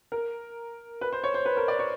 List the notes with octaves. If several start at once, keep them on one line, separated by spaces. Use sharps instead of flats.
A#4
B4
C5
C#5
C5
B4
A#4
D5
C#5